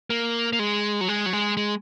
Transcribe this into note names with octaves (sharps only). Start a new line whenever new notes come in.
A#3
A#3
G#3
F#3
G#3
F#3
G#3
G#3